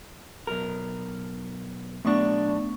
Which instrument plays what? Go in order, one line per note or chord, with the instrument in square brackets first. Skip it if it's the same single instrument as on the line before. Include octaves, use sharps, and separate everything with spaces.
[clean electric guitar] B1 A#4
[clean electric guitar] B1 D4 [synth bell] A3 B3 C#6